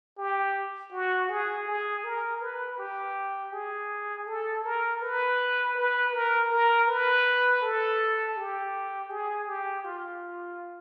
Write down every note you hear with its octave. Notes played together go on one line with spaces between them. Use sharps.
G4
F#4
G#4
G#4
A#4
B4
G4
G#4
A4
A#4
B4
B4
A#4
A#4
B4
A4
G4
G#4
G4
F4